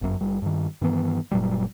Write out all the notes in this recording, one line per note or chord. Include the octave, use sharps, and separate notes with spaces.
G1 F#2
F#1 G3
G2 D#3
G2 D#3 E3 B3
F#1 A#2 F#3 G3